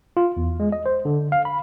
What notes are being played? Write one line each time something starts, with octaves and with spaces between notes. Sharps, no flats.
F4
E2
G#3
D#5
C5
D3
F5
B5